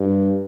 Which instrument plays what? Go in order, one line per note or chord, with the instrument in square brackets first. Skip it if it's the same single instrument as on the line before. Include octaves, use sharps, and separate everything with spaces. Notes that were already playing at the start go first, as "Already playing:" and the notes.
Already playing: [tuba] G2